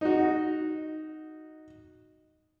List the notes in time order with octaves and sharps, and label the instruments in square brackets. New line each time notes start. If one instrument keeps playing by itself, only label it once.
[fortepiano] D#4 F#4